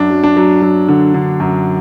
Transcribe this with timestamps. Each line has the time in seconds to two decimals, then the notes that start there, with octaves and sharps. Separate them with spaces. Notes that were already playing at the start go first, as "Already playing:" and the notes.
Already playing: F#2 D4
0.10 F#3
0.23 D4
0.37 F#3
0.62 F#3
0.88 D3
1.14 D3
1.40 F#2